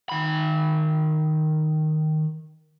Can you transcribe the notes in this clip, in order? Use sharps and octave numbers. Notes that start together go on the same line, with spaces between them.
D#3 B5